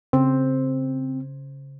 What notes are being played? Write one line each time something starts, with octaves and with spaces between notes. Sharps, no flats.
C#3 C4 C5